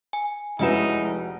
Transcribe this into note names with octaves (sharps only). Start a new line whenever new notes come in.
G#5
F1 G#3 C#4 D#4 E4 F#4 B4 G#5